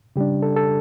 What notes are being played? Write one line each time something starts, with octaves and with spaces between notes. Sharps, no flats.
C#3 G3 D4 G4
A4
A4